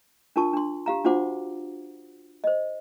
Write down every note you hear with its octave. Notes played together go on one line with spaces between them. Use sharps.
D4 F4 A#4 A5 C#6
D4 C6
G4 F5 A#5
D4 F4 F#4 C5 F#5 D6
C5 D#5